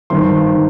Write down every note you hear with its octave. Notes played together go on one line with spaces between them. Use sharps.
G#1 G2 D#3 C6
D#3